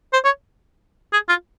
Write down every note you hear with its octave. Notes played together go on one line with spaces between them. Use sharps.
C5
C#5
G#4
F4